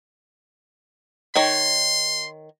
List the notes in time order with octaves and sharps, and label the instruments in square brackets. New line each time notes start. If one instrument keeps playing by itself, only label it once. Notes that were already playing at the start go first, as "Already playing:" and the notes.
[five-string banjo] D#3 C#5 [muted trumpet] C6